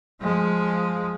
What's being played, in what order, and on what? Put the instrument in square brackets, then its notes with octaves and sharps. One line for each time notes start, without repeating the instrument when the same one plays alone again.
[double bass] F3 G#3